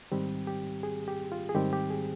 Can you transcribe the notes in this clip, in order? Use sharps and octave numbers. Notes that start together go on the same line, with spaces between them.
G#2 D#3 G3 C4 G4
G4
G#4
G4
F4
G#4
G#2 D#3 G3 C4 G4
G4
G#4